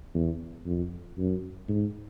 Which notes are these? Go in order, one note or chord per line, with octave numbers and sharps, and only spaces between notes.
E2
F2
F#2
G#2